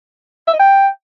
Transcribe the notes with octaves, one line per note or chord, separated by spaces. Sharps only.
E5
D#5
G5